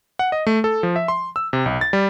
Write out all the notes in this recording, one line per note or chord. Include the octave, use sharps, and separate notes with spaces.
F#5
D#5
A3
A4
F3
E5
C6
E6
C3
B1
A6
G3